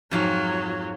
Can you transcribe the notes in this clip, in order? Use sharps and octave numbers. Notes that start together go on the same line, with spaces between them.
F2 G#2 F#3 F4 F5